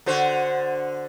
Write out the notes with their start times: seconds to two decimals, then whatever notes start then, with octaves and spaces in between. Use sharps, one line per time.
0.06 D3 F#4 C5